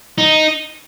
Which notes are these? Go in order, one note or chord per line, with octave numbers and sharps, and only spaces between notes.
D#4